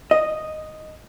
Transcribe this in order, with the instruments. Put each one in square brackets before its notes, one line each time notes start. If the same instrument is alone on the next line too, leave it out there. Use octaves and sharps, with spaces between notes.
[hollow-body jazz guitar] D#5